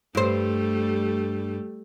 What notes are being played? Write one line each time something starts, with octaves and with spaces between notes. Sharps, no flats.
G2 G3 A3 C5